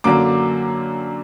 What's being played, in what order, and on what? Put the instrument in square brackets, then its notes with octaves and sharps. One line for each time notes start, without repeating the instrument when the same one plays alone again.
[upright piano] F#2 D3 F#3 A#3 D6